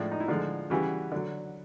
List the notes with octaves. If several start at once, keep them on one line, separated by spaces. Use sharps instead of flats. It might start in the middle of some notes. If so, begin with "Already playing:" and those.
Already playing: A2 F3 G#3 D4
D#4
E4
D3 F3 G#3 F4
C#3 E3 G3 F#4
D3 F#3